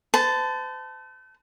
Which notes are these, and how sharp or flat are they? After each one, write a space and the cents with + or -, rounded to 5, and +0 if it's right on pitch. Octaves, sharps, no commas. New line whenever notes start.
C5 -45 A5 +0